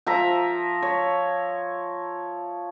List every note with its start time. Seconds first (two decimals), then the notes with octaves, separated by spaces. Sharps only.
0.07 F3 E5 A#5
0.82 C#5